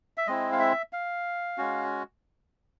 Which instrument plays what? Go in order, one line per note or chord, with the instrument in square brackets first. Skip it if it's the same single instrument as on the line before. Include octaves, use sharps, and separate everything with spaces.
[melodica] E5
G#3 C4 E4 D#5
F5
E5
F5
G#3 C#4 F#4